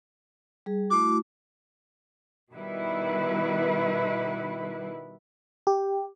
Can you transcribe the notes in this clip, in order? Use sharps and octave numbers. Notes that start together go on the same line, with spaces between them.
G3 G#4
A3 E4 F#4 D6
B2 D#3 G3 E4 B4
G4